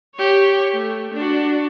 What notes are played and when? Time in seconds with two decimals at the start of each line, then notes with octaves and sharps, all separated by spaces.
0.16 G4 C#5
0.73 A3
1.14 D4 F#4